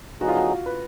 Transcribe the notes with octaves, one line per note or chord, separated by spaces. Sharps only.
D3 F#3 B3 D#4 F#4 G#4
F4
F#4
B4